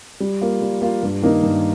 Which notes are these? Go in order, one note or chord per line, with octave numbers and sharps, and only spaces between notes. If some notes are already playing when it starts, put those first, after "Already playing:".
G3
A#3 F4
G3
A#3 F4
G2
D#3 A#3 D#4
G2